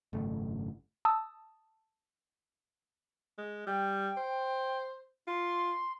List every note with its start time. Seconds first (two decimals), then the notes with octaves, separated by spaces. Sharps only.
0.13 G#1 F#2 C#3 A3
1.05 A5 D#6 E6
3.38 G#3
3.67 G3 G5
4.17 C5
5.27 F4 C6